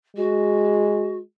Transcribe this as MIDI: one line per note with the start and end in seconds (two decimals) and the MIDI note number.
0.16 1.23 56
0.16 1.17 66